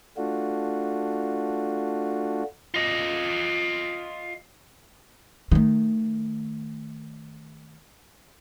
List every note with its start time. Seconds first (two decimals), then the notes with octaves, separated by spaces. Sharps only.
0.17 A3 D4 F4 F#4
2.74 F4 D#5
5.52 D#3 A3